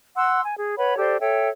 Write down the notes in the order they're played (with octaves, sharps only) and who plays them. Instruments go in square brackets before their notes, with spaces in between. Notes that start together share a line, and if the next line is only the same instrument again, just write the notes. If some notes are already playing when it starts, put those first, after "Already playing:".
[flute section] F#5 C6 E6
G#5
G#4
B4 C#5 F#5 B5
G4 A4 C5 D5
A4 C#5 E5 G5